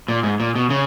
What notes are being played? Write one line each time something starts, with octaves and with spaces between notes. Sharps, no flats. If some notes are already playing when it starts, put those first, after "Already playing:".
A#2
G#2
A#2
B2
C#3